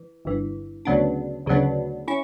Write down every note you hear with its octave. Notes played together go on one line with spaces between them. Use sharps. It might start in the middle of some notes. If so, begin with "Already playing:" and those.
Already playing: E3
G1 G2 E3
D2 C#3 F#3 B3 D4
D2 C#3 F#3 B3 D4
C#4 E4 C#6